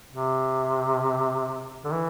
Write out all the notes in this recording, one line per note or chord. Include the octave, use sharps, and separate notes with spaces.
C3
D3
E3